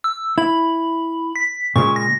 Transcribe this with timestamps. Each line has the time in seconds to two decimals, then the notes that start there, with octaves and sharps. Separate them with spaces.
0.04 E6
0.38 E4 B5
1.36 B6
1.76 A#2 C#3 G#3 C#6
1.96 A#6